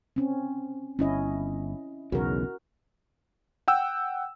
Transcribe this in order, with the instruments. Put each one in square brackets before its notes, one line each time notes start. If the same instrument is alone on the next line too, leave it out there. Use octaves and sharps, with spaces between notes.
[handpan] C4 C#4
[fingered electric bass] G1 [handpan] C#4 E4 D#5
[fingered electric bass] B1 E2 C#3 [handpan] F#4 A#4
[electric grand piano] F#5 G5 E6